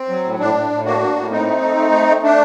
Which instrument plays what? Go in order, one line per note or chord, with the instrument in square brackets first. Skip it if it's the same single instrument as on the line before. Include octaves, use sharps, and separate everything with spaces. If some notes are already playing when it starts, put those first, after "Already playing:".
Already playing: [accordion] C4
F#3
A2
A2 D4
A2
A2
A#3 D4 F#4
A#3
A2
A#2 C4 D#4
A3
A3
A3
A3
A3
A3 D4